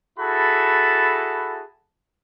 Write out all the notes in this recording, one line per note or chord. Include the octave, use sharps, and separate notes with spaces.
E4 F#4 G#4 A4 A5 B5